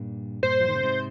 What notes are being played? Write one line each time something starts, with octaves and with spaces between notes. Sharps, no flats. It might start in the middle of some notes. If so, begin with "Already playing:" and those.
Already playing: G2 A#2
G2 A#2 C5
F3
D#3
C#3
G#2 C3